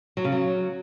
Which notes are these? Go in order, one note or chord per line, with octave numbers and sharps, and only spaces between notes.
F#3
C#3
F#3